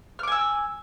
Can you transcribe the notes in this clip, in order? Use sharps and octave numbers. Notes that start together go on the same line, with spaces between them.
G#5 D6 E6 F6